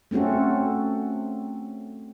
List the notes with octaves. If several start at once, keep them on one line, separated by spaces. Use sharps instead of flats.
A3 C4 C#4 F#4 A4